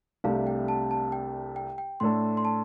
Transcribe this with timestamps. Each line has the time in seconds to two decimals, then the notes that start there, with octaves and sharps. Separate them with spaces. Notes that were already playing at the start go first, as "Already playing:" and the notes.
0.24 C2 C3 A3 D4 G4 F5
0.47 G5
0.68 A5
0.91 A5
1.12 G5
1.56 G5
1.78 G5
2.00 A2 A3 D4 A4 C6
2.37 C6
2.45 A5